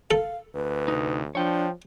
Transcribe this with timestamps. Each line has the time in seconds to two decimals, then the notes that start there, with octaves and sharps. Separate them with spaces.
0.11 A4 F5
0.55 D2 B4
0.88 C3 D#4
1.35 F3 D4 C#5 G5